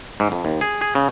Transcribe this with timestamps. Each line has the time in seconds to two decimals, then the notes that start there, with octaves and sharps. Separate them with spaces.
0.20 G#2
0.32 F2
0.45 D#2
0.61 G#4
0.81 G#4
0.95 C#3